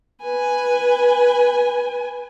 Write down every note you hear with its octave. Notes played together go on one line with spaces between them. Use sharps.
B4 G#5